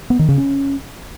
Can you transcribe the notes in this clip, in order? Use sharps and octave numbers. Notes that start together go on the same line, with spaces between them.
B3
D#3
C#3
C#4